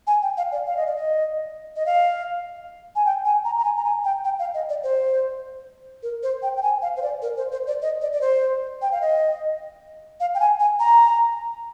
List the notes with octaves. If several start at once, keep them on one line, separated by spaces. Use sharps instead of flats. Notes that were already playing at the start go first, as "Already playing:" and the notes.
G#5
G5
F5
D5
F5
D#5
D5
D#5
D#5
F5
G#5
G5
G#5
A#5
A#5
G#5
A#5
G#5
G5
G5
F5
D#5
D5
C5
A#4
C5
G5
G5
G#5
F5
C5
D5
A#4
C5
C5
D5
D#5
D5
D5
C5
G5
F5
D#5
F5
G5
G#5
G#5
A#5